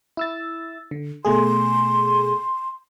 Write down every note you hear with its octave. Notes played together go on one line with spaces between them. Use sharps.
E4 E6 A6
D3
B2 A3 G#4 C6